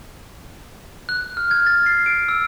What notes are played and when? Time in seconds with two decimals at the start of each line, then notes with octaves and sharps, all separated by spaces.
1.09 F#6
1.37 F6
1.51 G#6
1.66 A6
1.86 C7
2.06 D7
2.29 E6